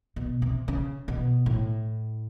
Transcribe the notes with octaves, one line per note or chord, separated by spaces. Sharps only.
B2
C3
C#3
B2
A2